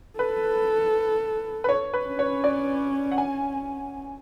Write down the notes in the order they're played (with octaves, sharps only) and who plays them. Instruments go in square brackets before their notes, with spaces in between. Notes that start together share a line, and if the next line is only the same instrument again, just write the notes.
[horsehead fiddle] A4 [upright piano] B4
[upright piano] B4
C#5
B4
[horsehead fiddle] C#4
[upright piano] C#5
D5
F#5
G#5